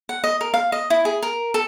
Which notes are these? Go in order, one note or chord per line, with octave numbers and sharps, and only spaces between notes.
F#5
D#5
A#4
F5
D#5
E4
G#4
A#4
A4